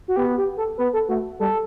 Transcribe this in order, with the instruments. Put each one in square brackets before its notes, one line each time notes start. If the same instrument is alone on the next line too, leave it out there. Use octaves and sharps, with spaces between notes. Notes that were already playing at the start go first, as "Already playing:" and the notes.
[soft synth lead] F#4
[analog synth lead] B3 [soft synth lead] G4
[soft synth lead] G4
A4
[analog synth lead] B3 [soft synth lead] B4
[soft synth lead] A4
[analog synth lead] A3 [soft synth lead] F#4
[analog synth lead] G3 [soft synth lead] A4